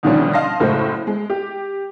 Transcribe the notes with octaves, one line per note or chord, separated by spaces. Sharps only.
D2 B2 D#3 F3 G3 C#4
D#5 F5 A5 C6 A#6
F#1 A2 G#3 A3 F#4 C5
G#3
G4